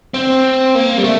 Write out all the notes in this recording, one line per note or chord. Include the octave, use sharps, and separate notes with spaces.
C4
A#3
G3
A3